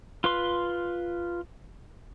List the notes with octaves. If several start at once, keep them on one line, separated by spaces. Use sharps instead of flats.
F4 B4 C6